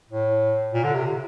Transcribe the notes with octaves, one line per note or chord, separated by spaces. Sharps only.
A2
A#2
D3
C3